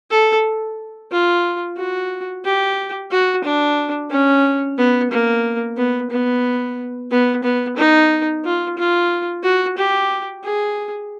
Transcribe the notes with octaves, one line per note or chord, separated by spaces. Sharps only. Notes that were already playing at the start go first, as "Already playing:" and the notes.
A4
F4
F#4
G4
F#4
D4
C#4
B3
A#3
B3
B3
B3
B3
D#4
F4
F4
F#4
G4
G#4